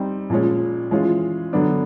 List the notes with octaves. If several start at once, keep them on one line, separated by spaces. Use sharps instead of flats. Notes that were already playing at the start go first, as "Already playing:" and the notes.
Already playing: G3 C4 D#4
A#2 F3 G#3 C#4
E3 G#3 C#4 F4
D3 F#3 B3 D4